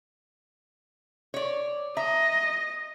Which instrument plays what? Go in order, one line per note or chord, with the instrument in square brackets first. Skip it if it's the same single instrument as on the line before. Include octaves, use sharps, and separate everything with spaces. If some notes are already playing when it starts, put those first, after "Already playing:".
[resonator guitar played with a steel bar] C#5 D5
[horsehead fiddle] D#5 [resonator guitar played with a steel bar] E5 A#5